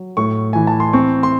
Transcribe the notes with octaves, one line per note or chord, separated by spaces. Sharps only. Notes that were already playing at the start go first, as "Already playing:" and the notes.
Already playing: F#3
A2 C#6
E3 G#5
A5
C6
C4 C#6
C6